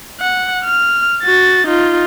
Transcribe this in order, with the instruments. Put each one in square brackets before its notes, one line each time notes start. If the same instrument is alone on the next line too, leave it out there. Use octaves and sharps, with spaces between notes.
[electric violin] F#5
F6
F#4 A6
D#4 F4